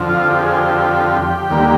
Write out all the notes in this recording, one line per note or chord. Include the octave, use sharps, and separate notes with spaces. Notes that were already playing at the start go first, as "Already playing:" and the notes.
Already playing: F2 D3 F3 C4
F4
G4
G#4
G4
D#2 D3 G3 A#3